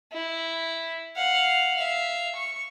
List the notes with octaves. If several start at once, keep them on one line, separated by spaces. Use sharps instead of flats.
E4
F5 F#5
E5 F5
C#6